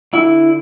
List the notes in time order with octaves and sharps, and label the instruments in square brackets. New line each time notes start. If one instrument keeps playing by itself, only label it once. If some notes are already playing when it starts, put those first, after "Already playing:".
[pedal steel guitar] D3 E4